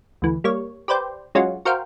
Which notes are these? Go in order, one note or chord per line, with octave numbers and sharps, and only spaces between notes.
D2 E3
G3 A#3 C#5
G4 B4 C5 D5 G5
F#3 G#3 C#4 F4 F#4
F#4 A#4 C5 F5 G5